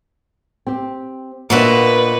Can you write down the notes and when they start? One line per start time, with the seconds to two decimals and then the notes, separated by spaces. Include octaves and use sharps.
0.67 C4 G4
1.50 A#2 A#3 B3 D4 F#4 B4 D#5 E5